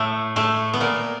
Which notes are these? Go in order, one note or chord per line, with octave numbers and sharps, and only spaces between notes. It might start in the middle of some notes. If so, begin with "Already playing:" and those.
Already playing: A2 A3
A2 A3
B3
A#2 A#3